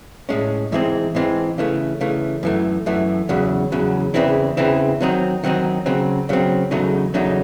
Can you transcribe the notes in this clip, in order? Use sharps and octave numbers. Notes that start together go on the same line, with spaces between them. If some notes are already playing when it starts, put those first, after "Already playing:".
A2 G#3 C#4
G#2 E3 G#3 C4
G#2 E3 G#3 C4
C#3 E3 A3
C#3 E3 A3
F#2 E3 A3
F#2 E3 A3
E2 C#3 F#3
E2 C#3 F#3
E2 C#3 E3 C4 E4
E2 C#3 E3 C4 E4
D#3 F#3 C4 D#4
D#3 F#3 C4 D#4
C#3 F#3 C4
C#3 F#3 C4
E2 C#3 F#3 A3 D#4
E2 C#3 F#3 A3 D#4